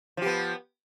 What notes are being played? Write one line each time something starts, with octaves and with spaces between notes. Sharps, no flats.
F3 B3 G4